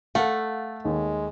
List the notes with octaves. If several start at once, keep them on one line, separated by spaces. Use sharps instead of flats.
A3 A4 F5 F#5
D#2 G#3